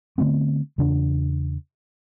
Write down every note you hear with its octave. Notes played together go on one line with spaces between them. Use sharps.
D3 A3 B3 C4
E2 C#3 D4